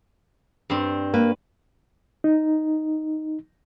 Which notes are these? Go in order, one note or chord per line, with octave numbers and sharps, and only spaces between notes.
G2 C4
A#3 B4
D#4